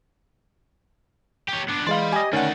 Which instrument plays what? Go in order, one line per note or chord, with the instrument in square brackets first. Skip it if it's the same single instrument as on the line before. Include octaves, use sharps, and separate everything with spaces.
[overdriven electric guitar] G4 C#5
B3 D4
[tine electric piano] E3 G#3 [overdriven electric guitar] D5 B5 [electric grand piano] F5 C6
[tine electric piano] G4 D#5 [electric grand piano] G#5
[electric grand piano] D#3 F#5 [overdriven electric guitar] A3 D5 [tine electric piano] C#4